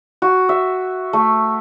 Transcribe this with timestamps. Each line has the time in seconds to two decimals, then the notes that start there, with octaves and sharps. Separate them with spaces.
0.22 F#4
0.49 E5
1.13 A3